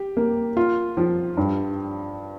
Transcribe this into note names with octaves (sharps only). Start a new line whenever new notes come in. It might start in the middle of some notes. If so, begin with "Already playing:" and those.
Already playing: G4
A#3
F4
F3
G2